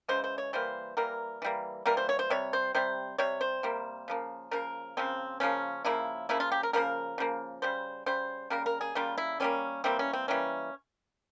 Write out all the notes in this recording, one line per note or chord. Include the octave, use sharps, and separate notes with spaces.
C#3 E3 G#3 C5
C5
C#5
E3 G3 A#3 C5
E3 G3 A#3 A#4
E3 G3 A#3
E3 G3 A#3 A#4
C5
C#5
C5
C3 G3 C#5
C5
C3 G3 C5
C3 G3 C#5
C5
C3 G3 A#3
C#3 F3 A#3
C#3 F3 A#3 A#4
C#3 F3 A#3 C4
C#3 F3 A#3 C#4
C#3 F3 A#3 E4
C#3 F3 A#3 E4
F4
G4
A#4
C#3 F3 A#3 A#4
C#3 F3 A#3
C#3 G3 C5
C#3 G3 C5
C#3 G3 A#3 A#4
A#4
G#4
C#3 G3 A#3 F4
E4
E3 G3 A#3 C#4
E3 G3 A#3 C4
C#4
C4
E3 G3 A#3 C#4